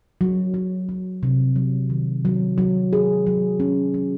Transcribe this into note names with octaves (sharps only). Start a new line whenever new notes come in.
F#3
F#3
F#3
C3
F#3
D#3
F#3
F#3
G#4
F#3
C#4
F#3